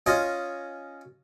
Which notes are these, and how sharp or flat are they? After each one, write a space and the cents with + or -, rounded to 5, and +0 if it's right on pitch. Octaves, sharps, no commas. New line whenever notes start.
C#4 +0 F4 +0 D#5 +0